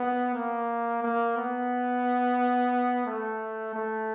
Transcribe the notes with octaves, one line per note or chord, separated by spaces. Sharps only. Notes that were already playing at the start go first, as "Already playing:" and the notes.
Already playing: B3
A#3
A#3
B3
A3
A3